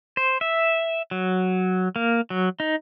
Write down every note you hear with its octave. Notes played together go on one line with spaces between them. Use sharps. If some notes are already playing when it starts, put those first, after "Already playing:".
C5
E5
F#3
A#3
F#3
D#4